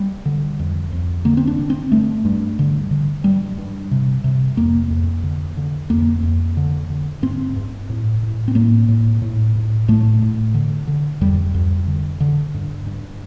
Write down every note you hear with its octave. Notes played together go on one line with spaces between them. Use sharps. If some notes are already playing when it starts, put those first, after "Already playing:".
Already playing: G3
D3
F2
F2
D3 A#3
C4
D4
D3
C4
G2 A3
G2
D3
D3
G2 G3
G2
C3
C3
F2 A#3
F2
D3
D3
F2 A#3
F2
D3
D3
G2 C4
G2
A2
A2
C4
A2 A#3
A2
A2
A2
A2 A3
A2
D3
D3
F2 G3
F2
D3
D3
G2
G2